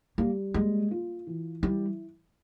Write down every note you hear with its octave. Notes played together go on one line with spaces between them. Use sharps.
G3 A#3
G#3 A#3
F4
E3
G3 E4